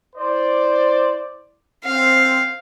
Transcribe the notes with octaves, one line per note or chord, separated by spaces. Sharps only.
E4 C5 D5
C4 F5